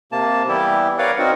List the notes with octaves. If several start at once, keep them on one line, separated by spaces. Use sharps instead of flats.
C3 A#3 A5
E3 G3 B3 E4 G4
A#4 B4 C#5 D5 F5 F#5
C4 D#4 F#4 A#4 F#5